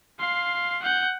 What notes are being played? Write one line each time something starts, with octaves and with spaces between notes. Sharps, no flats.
F5 C6
F#5 G6